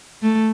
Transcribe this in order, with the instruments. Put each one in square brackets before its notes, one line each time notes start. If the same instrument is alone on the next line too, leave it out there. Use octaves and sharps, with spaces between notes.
[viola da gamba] A3